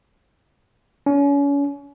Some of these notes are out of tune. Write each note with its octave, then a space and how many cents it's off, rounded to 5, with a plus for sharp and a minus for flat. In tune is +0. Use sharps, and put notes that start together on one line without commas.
C#4 +35